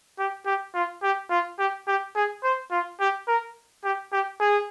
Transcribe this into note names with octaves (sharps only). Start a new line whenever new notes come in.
G4
G4
F4
G4
F4
G4
G4
G#4
C5
F4
G4
A#4
G4
G4
G#4